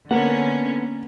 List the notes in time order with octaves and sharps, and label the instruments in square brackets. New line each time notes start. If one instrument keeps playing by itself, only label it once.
[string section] D3 C#4 [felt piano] A#3 [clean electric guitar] B3 F#5